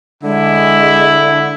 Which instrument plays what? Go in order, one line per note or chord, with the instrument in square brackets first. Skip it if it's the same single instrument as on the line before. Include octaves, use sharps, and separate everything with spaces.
[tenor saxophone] D3 [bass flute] G#3 [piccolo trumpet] E4